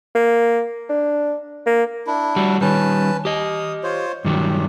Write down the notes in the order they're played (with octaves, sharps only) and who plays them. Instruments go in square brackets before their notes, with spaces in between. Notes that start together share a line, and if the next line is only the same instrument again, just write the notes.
[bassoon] A#3
D4
A#3
[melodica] D4 E4
[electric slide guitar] G3 F#4
[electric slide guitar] D#3 G3 [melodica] C#4 B4 A5
[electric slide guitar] G4 D#5 [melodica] D#6
[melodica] F4 C5 C#5
[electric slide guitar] G2 D#3 F#3 [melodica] G4